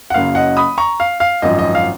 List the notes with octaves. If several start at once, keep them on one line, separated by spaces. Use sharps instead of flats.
F#5
F#1 F#2 C#3 F#3 F5
D#5 F#5
B5 D#6
A#5 C#6
F5
F5
G#1 F#2 F3 D#5
D#5
F5